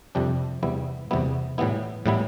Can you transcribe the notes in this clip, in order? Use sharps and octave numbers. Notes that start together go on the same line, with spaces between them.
F2 C3 G3 D4
E2 C3 G3 B3 E4
E2 C3 G3 B3 E4
A2 E3 G3 B3 E4
A2 E3 G3 B3 E4